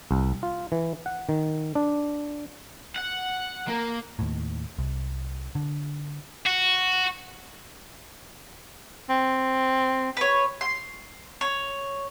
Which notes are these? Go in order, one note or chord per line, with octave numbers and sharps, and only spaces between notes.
C2
F4
E3
F#5
D#3
D4
F#5
A#3
D#2 A2
C2
D3
F#4
C4
B4 C#5
C6
C#5